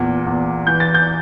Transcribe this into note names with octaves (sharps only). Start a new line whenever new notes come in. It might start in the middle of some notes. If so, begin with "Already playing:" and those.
Already playing: E2 A#2
E2
E3 G6
A6
G6